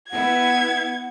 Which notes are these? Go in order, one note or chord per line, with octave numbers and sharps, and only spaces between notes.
B3 E4 F#5 G#6